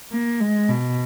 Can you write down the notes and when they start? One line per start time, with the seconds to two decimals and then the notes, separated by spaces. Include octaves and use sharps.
0.12 A#3
0.40 G#3
0.69 B2